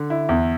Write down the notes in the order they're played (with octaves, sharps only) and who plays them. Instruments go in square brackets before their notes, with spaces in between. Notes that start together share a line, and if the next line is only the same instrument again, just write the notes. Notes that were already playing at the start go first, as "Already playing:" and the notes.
Already playing: [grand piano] D3
E4
E2